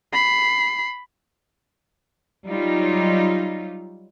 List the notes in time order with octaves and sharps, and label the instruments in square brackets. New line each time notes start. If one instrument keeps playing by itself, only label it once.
[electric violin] B5 C7
[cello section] F#3 G3 D#4 F4